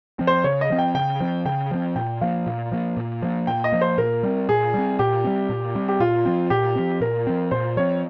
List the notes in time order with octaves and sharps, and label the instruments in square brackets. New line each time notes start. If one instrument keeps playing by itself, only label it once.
[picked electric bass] F3 C4
[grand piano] C5
[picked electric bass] C#3 [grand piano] C#5
[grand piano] D#5
[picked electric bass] F3 C4
[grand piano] G5
[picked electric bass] C#3 [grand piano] G5
[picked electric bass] F3 C4
[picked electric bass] C#3 [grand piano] G5
[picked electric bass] F3 C4
[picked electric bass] A#2 [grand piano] G5
[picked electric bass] F3 A#3 [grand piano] F5
[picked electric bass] A#2
F3 A#3
A#2
F3 A#3
[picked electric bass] A#2 [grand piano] G5
[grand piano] D#5
[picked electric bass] F3 A#3
[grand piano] C5
[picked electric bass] A#2 [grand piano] A#4
[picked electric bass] G3 C4
[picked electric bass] A#2 [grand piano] G#4
[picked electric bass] G3 C4
[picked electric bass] A#2 [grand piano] G4
[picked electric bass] G3 C4
A#2
G3 C4
[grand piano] G4
[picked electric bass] A#2 [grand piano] F4
[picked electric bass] F3 C4
[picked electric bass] A#2 [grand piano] G4
[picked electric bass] F3 C4
[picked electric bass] A#2 [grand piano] A#4
[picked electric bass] F3 C4
[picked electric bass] A#2 [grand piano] C5
[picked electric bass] F3 C4 [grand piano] C#5